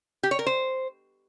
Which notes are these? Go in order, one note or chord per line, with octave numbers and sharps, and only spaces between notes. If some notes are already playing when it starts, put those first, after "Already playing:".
G4
C#5
A#4
C5